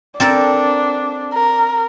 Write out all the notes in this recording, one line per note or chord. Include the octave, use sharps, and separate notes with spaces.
C4 D4 A4 A#4
A#4